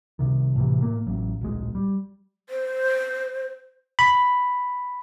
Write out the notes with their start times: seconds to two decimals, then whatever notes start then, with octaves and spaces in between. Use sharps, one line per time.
0.19 C2 C3 D#3
0.56 A2 C3 E3
0.81 A2 A#3
1.07 A1 F#3
1.41 D1 A#1 G#3
1.75 G3
2.49 C5
3.99 B5